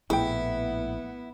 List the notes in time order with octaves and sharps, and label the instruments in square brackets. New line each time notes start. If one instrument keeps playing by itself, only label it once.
[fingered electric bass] A#1 A2 [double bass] B3 [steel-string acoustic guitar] E4 [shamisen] G#4 G5